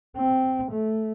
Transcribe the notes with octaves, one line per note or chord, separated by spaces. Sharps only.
C4
A3